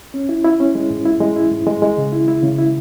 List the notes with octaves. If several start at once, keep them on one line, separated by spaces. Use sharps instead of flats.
C#4
E4
E4
C#4
G#3
G#2
E4
G#3
E4
G#2
G#3
G#3
C#3
E4
E4
C#3
E4